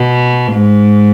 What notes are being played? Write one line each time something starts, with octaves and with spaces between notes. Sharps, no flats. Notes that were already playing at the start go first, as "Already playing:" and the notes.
Already playing: B2
G#2